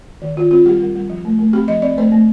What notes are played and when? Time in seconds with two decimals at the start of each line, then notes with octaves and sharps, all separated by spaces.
0.22 D#3
0.36 D#3 F4
0.51 C4 F4
0.66 G3 G4
0.80 G3
0.95 G3
1.10 F3
1.25 A3
1.39 A3
1.53 C4 G4
1.68 F3 D#5
1.82 C4 D5
1.97 A3 C5
2.12 A3